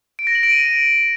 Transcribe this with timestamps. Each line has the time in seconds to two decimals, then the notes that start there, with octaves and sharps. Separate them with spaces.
0.19 D7
0.27 A#6
0.35 F#7
0.43 D7
0.51 D#7